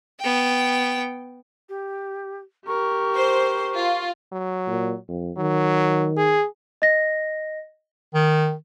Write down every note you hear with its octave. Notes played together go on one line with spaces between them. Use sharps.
B3 G5
G4
G4 A#4 C#6
C5
F4
F#3
A#2
F2
D#3 F#3
G#4
D#5 A#6
D#3